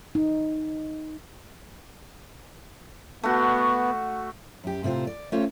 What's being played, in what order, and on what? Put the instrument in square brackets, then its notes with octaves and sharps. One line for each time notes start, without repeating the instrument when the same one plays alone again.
[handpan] D#4
[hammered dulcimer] A3 F#4 [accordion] B3
[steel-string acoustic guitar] F#2 G4
A2 C3 C4 F4 C5
D5
A3 C#4 F4 C5 C#5 F5